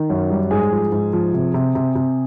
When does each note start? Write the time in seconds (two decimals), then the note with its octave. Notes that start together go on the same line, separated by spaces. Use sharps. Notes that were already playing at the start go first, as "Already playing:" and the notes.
Already playing: D#3
0.10 F#2
0.30 G3
0.51 G#2 G#4
0.72 F3
0.92 G#2
1.13 F3
1.33 C3
1.54 C3
1.75 C3
1.95 C3